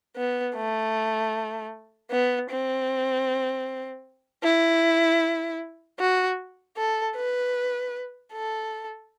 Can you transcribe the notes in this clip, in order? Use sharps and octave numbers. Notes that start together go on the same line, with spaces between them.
B3
A3
B3
C4
E4
F#4
A4
B4
A4